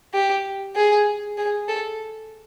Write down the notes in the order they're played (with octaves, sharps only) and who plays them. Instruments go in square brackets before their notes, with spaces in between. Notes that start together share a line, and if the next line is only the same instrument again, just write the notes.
[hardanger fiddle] G4
G#4
G#4
A4